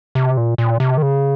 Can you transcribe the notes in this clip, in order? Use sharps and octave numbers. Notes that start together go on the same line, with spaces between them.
C3
A#2
A#2
C3
D#3
C#3